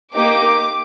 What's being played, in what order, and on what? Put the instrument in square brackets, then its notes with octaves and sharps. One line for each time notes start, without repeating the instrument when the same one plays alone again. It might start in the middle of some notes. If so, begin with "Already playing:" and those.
[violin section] A#3 D#4 G4 D6